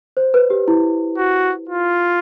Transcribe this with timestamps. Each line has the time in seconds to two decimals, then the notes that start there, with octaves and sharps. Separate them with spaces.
0.17 C5
0.34 B4
0.50 G4
0.68 E4
1.18 F#4
1.69 F4